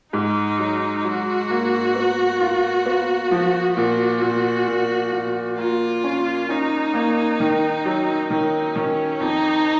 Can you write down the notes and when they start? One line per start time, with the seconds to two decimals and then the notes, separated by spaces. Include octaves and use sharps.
0.13 G#2 D#4
0.59 F#3
1.04 F#3 F#4
1.50 A#3
1.95 B3
2.41 F4
2.86 B3
3.31 F3
3.76 A#2 F#4
4.22 A#2
4.68 A#2
5.13 A#2
5.58 A#3 F4
6.04 C#4
6.49 C#4 D#4
6.94 A#3
7.40 D#3
7.85 F#3
8.30 D#3 D#4
8.76 D#3 C#4
9.21 F2 D#4